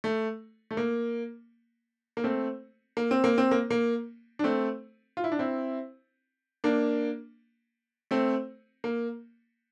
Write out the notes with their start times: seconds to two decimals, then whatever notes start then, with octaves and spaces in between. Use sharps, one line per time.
0.04 A3
0.71 A3
0.77 A#3
2.17 A#3
2.24 A3 C4
2.97 A#3
3.11 C4
3.24 A#3
3.38 C4
3.51 A#3
3.70 A#3
4.39 D4
4.44 A3 C4
5.17 F4
5.24 E4
5.32 D4
5.39 C4 E4
6.64 A#3 D4
8.11 A3 C4
8.84 A#3